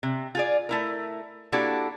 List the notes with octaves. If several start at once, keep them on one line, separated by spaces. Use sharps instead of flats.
C3
F4 G#4 D5
A3 E4 A#4
A#3 D4 E4 F#4 G4 A4